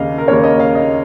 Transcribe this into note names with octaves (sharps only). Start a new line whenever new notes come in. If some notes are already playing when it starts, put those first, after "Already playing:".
Already playing: D#2 C#3 A#3 D#5 F5
A#4
D#2 C#3 A#3 C#5
D#5
F5
D#5